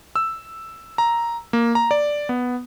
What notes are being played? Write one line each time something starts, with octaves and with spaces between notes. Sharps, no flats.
E6
A#5
A#3
A#5
D5
B3